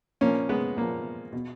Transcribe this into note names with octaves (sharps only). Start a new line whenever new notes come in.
A#2 F3 A#3 C#4
G#3 B3
A#2 F3 A#3
B2